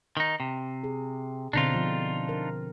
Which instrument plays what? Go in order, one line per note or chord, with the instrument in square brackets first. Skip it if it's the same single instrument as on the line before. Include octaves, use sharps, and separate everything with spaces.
[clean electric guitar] D#3 D#4
C3
[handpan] G#4
[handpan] B2 D3 C4 [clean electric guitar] D4 D#4 F4
[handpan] F3
A#4